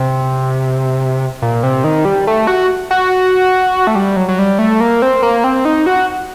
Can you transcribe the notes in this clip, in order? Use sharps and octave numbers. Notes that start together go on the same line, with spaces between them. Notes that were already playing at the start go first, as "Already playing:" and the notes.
Already playing: C3
A#2
C3
D#3
G3
A3
F#4
F#4
A3
G3
F#3
F#3
G3
A3
A#3
C4
A#3
C4
D#4
F#4